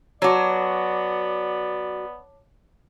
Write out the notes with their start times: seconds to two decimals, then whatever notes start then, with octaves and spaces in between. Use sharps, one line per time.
0.22 F#3 B3 F#4 C#5 D5 A5 D6